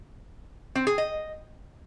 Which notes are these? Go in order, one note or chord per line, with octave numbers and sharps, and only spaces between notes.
C4
G#4
D#5